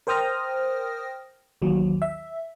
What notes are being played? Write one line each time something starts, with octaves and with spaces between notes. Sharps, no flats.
A#4 C5 G5 D#6 F6 A#6
A1 D#2 F#3
E5